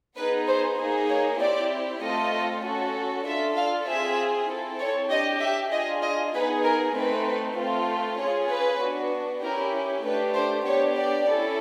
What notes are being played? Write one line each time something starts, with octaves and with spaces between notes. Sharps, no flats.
B3 D#4 G#4 B4
C5
A#3 D#4 G#4
C#5
C4 E4 G4 D5
A3 C4 F4 A4 D#5
C#4 F#4 A4
D4 F4 A4 E5
F5
C4 F4 G#4 E5
C4 E4 A4
C#5
D4 G4 D#5
E5
D4 F4 G#4 D#5
D#5
B3 D#4 G#4 B4
A#4
A3 C4 D#4 B4
A3 C4 F4 A4
C#4 F4 G#4 C#5
B4
B3 D4 F#4
C#4 E4 G4 A#4
A3 D4 G4 B4
C5
B3 D4 G4 C#5
D5
C#4 E4 A4